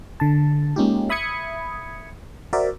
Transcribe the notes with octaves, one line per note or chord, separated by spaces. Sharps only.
D3 A5
G#3 A#3 C#4 D#4 F4 G4
E5 B5 D#6 G#6 C#7
F#4 A#4 C5 D5 E5